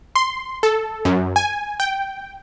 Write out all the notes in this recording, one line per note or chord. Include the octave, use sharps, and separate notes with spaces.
C6
A4
F#2
G#5
G5